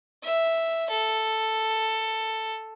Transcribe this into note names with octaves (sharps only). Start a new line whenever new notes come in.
E5
A4